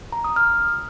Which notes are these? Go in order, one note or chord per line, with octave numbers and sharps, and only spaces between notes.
A#5
D#6
F6